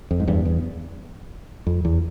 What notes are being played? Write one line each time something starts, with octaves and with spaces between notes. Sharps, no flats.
F2
G#2
E2 G2
E2
F2
E2